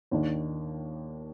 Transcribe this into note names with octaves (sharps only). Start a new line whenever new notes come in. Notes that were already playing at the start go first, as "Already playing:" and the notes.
D#2 D#3 A#3 D4